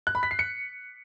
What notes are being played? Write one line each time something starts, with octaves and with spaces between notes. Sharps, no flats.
F#6
B5
B6
C7
C#7